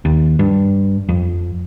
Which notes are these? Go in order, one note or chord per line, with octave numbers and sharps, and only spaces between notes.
D#2
G2
F2